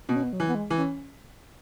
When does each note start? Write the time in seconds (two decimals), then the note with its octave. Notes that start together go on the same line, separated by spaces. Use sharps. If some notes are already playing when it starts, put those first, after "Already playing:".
0.09 B2 B3
0.16 C#4
0.23 B3
0.33 F#3
0.40 E3
0.48 B3
0.55 G#3
0.70 E3
0.78 C#4